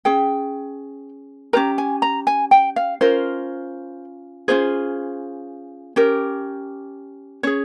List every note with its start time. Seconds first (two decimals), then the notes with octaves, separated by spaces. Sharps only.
0.05 C#4 G#4 G5
1.53 C#4 G4 A#4 A#5
1.78 G#5
2.02 A#5
2.27 G#5
2.51 G5
2.76 F5
3.01 C#4 F4 A#4 C5
4.48 C#4 F4 G#4 C5
5.96 C#4 G4 A#4
7.43 C#4 G#4 C#5